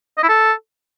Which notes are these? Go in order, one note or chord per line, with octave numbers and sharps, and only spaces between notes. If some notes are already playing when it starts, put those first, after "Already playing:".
D#5
E4
A4